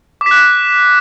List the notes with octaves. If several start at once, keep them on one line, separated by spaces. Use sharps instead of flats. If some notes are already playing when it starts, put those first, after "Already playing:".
D6
B6
F#6
B6